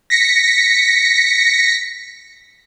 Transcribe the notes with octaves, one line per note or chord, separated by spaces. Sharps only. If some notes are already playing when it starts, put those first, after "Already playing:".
A#6 B6 C#7